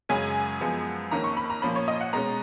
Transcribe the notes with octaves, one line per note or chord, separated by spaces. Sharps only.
F#2 C#3 G#3 C#4 G#5
F#2 F3 G#3 B3
F2 D#3 A#3 C#4 A#5
C#6
B5
A#5
A#2 F3 A#3 C#4 B5
C#5
D#5
F#5
B2 G#3 C#4 A#5